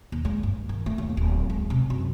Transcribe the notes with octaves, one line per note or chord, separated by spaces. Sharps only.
D#2
G#3
G2
D#3
A3
D#2
D1
G#3
C3
F#2